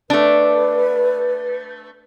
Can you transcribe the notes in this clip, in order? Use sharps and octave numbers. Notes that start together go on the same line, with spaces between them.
A3 D4 B4